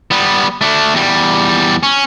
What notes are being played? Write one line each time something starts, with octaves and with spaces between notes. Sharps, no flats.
G3 B3
A3 D4
E2 G3
C#4